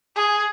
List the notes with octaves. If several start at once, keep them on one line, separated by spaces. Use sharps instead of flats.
G#4